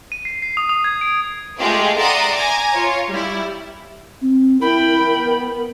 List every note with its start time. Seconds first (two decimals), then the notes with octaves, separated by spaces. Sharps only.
0.12 D#7
0.25 C7
0.42 C7
0.57 D#6
0.69 D#6
0.84 G#6
1.01 D7
1.58 G#3 A3 F4 G4 G#4
1.96 D5 E5 F#5 A#5 C6 D#6
2.34 G#5 A#5 D6
2.74 F4 C#5
3.10 G3 E4
4.22 C4
4.61 E4 A#4 G5 B5
5.17 B3